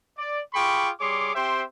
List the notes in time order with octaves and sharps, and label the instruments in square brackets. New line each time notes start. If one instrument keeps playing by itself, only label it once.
[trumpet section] D5
F4 G#4 G5 B5 C#6 D6
G3 G#4 C#5 C6 D6
C4 G4 C5 E5 G5 C6